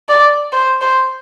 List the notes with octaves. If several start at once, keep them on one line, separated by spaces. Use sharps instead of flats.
D5
C5
C5